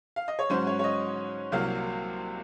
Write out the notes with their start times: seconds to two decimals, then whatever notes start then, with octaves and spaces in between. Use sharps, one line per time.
0.16 F5
0.28 D#5
0.39 C#5
0.50 G#2 F#3 C#4 C5
0.67 C#5
0.79 C#5
0.84 D#5
1.52 C2 C3 F#3 A#3 F5